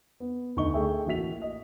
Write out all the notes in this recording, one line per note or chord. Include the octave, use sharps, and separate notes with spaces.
B3
D2 D#4 D#5 C#6 G7
A3 G#4 E5 G5
A1 A#3 F#4 E5 B6 F7
D#5